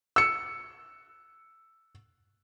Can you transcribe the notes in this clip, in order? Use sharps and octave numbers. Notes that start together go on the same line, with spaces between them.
E6 C#7